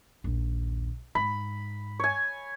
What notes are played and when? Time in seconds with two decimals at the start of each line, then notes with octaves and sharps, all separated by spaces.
0.24 A#1 D#2
1.15 G#2 B5
2.00 C#5 G#5